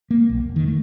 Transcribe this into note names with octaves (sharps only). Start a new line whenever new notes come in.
A#3
B1
E1
D#3
A3